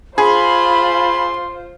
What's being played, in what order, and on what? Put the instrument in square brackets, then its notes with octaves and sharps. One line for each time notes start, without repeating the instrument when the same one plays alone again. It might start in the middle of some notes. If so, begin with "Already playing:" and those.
[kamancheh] F4 C5 [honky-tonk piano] G#4 [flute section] B5 [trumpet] C6